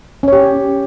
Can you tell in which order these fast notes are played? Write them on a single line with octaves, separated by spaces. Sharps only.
C#4 C#5 G4